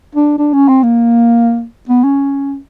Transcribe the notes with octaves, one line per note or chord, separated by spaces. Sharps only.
D4
D4
C#4
C4
A#3
B3
C#4